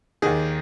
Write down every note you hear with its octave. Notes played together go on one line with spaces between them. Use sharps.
D#2 D#3 G#4